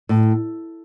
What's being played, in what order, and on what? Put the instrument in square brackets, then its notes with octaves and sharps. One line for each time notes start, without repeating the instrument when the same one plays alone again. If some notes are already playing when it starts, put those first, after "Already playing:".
[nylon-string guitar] A2